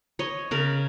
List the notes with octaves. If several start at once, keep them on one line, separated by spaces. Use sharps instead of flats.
C#5 D#5
C#3 A#4